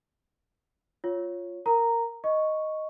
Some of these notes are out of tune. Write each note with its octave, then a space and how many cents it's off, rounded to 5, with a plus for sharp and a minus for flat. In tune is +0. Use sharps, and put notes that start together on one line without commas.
F4 +0 C#5 +0
A#4 -10 A#5 -10
D#5 +0 C#6 +0